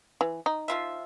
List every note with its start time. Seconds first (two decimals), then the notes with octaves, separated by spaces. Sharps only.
0.21 E3
0.46 D#4
0.68 F3 F4 E5